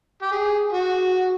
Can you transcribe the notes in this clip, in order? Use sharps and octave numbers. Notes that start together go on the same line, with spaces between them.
G4
G#4
F#4